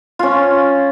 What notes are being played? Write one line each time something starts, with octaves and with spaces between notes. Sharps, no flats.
C#4 F4